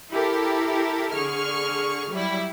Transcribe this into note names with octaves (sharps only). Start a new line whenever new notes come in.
E4 G4 A4 A#4
D3 G#4 C#6 F6
F#3 G3 E4